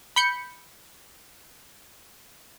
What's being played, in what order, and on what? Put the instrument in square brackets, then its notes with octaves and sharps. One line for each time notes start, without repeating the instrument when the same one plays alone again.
[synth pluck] B5 G6 C#7